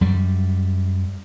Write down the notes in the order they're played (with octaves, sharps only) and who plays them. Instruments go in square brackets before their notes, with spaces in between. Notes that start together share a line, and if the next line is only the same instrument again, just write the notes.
[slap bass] F#2 G3